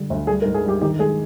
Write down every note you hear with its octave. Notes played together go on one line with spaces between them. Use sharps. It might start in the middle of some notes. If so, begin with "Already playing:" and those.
Already playing: D3 G3 G#3
D2
G3 G#4
A#4
G#2
G#4
G3 G4
D#3 G4
G#3 G#4